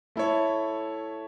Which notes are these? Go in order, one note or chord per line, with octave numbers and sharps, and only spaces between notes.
A3 E4 A4 C#5